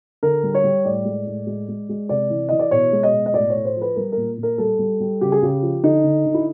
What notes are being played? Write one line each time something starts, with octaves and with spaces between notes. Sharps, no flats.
D3 A#4
G3
C#5
G3
A2 D5
G#3
A2
G#3
G#3
G#3
C3 D5
E3
E3 D#5
D5
B2 C#5
G#3
D#5
B2
D#5
A2 D5
A2 C#5
C5
F3
B4
G3 A#4
A#2 A#4
A#2
A#4
G3 A4
G3
G3
C#3 G4
G#4
C#3 G4
F3
D3 D#4
D3
D3
E4